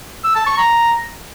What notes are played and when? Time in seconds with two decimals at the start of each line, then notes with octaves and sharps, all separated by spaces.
0.24 E6
0.35 A5
0.47 C#6
0.58 A#5